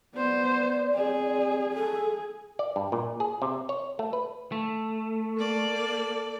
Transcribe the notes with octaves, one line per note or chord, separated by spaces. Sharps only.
B3 C5 D5
C4 G#4
G#4 A4
D5
G2
A#2
G#4
C3
C#5
A3
B4
A3
A#3 A4 D5